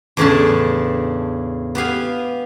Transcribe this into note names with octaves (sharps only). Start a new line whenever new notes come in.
E2 A2 C#3 C#4 D4 A5
B3 G4 F5 G#5